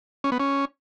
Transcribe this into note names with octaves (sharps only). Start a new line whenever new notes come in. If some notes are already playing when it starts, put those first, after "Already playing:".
C#4
B3
C#4